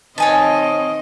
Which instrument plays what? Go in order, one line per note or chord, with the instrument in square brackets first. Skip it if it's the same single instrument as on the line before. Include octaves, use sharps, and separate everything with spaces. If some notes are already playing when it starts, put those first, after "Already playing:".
[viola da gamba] D#3 C4 D#5 [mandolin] C#5 G#5 A5